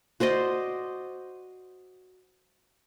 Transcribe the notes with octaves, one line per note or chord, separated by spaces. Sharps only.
F#4 C5 D5 D#5